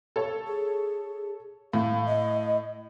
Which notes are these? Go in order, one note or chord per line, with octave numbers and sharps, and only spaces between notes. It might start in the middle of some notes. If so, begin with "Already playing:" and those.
A4 C#5
G#4
A2 F5
D#5